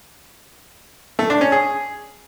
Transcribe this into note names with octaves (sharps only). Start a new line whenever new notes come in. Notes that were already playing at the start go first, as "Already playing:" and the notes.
A3
D4
C#4
G#4